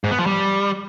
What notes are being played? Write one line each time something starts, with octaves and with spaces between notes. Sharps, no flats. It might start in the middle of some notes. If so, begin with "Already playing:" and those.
G#2
B3
F3
G3